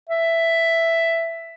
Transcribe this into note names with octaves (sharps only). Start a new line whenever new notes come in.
E5